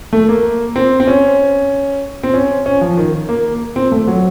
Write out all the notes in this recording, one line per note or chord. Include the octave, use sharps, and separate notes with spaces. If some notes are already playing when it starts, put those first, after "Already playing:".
A3
A#3
C4
C4
C#4
C4
C#4
C#4
F3
D#3
A#3
C4
A3
F#3